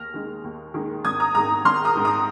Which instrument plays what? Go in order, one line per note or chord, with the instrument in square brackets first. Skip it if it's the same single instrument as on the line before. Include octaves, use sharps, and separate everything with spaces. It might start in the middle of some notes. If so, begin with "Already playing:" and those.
Already playing: [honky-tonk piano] D#2 F6 A#6
D#3 G#3
D#2
D#3 G#3
G#1 D#6 G#6
A#5 D#6
G#2 D#3 A#5 D#6
G#1 C6 F6
A#5 D#6
G#2 D#3
A#5 D#6